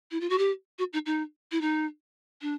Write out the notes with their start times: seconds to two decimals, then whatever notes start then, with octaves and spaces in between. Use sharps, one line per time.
0.11 E4
0.21 F4
0.30 F#4
0.38 G4
0.79 F#4
0.93 D#4
1.06 D#4
1.52 E4
1.61 D#4
2.42 D4